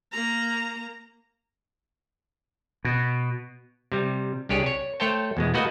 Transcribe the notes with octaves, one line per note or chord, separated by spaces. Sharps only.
A#3 A#5
B2
C3 G3
C2 D4 G4 G#4 C#5 D5
C#5
A3 A4 C5 C#5 G5 A5
E2 B2 G#3
A3 A#3 F#4 B4 D#5 A5